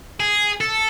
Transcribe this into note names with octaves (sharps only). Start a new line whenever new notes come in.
G#4
A4